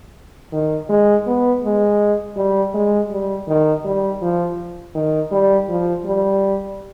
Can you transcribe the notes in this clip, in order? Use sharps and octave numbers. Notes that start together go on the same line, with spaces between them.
D#3
G#3
B3
G#3
G3
G#3
G3
D#3
G3
F3
D#3
G3
F3
G3